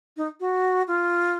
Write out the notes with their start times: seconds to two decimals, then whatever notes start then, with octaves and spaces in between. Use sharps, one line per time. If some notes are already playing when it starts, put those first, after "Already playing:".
0.17 D#4
0.40 F#4
0.88 F4